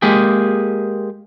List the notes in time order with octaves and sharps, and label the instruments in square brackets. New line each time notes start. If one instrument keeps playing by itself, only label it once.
[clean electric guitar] G#3 A#3 G4 G#4